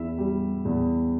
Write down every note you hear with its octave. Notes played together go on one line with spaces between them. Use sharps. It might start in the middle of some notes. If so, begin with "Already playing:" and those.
Already playing: E2 E4 E5
G3
E2